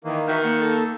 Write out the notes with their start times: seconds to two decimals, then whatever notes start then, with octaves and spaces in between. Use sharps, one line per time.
0.04 D#3 E3 A#3
0.28 D#3 F#4 E5
0.43 A#3 F#5
0.60 A4